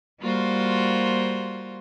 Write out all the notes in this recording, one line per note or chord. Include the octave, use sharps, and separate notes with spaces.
G3 A#3 F4 F#4 C5